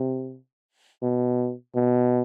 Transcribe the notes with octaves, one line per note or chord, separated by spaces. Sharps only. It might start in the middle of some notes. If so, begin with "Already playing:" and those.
Already playing: C3
B2
B2